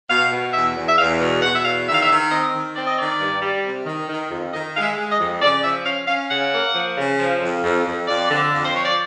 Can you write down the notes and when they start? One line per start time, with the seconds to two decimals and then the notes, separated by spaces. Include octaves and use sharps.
0.09 B2 F5
0.32 B2
0.53 E2 E5
0.76 E2
0.89 E5
0.98 E2 F5
1.21 B2
1.42 B2 F#5
1.55 E5
1.64 E2 F5
1.87 D#3 E5
1.94 F5
2.02 E5
2.09 D#3
2.31 C4 D#5
2.53 D#3
2.76 C4 D5
2.87 D#5
2.98 D#3 D5
3.20 G2
3.42 G3
3.64 C3
3.86 D#3
4.09 D#3
4.30 F2
4.53 D#3 D#5
4.76 G#3 F5
4.83 E5
4.98 G#3
5.12 D#5
5.19 F2
5.42 C#3 D5
5.63 F3 E5
5.86 C#4 F5
6.07 C#4 F5
6.31 C#3 F#5
6.53 A#3
6.75 F3
6.97 C#3
7.19 F3
7.41 F2
7.63 F2
7.86 F2
8.07 F2 D5
8.30 D3
8.52 F2
8.65 C5
8.75 F3 C#5
8.85 D5